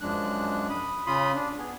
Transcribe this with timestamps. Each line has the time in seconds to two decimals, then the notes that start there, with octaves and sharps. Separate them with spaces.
0.01 F#2 F3 G#3 D4 F#6
0.70 B5 D#6
1.07 C#3 F4 B5 C6 D#6
1.34 D4
1.58 B3 G#4